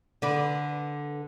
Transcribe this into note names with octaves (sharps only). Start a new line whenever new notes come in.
D3 B4 D5